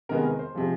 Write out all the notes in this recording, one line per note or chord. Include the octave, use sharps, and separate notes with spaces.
C3 D#3 G#3 B3 A#4
A#4
C5
C3 F3 G#3